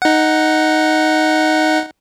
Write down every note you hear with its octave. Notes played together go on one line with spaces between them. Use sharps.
D#4 F#5